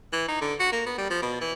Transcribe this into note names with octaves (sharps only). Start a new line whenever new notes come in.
E3
D#4
D3
F#4
A#3
B3
G3
F3
B2
E3